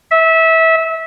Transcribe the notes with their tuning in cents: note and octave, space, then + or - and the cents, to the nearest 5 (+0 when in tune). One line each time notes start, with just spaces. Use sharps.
E5 -20